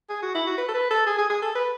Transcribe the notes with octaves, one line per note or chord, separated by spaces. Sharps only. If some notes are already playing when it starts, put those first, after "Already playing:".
G#4
F#4
E4
F#4
B4
A4
B4
A4
G#4
G#4
G#4
A4
B4